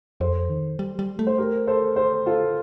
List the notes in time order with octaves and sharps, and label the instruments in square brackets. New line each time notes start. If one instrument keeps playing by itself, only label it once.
[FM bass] F2 [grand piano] A4 C5
[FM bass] D#3
G3
G3
A3
[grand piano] C5
G4 A#4
A4 C5
A4 C5
F4 A4